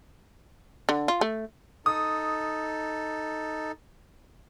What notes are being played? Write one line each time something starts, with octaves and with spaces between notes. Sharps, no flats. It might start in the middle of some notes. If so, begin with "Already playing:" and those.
D3
F4
A3
D#4 A4 D#6